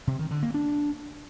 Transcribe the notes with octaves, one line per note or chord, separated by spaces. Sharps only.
C3
D#3
D3
A#3
D4